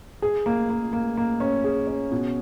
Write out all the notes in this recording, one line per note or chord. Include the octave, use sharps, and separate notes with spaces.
G#4
A#3
A#3
A#3
A#3
C#4
G#4
C#4
B2